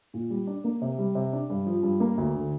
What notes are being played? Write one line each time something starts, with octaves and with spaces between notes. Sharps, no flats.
A#2
G3
D4
A#3
C3
G3
C3
D4
G2
F3
G2
A#3
D2
D3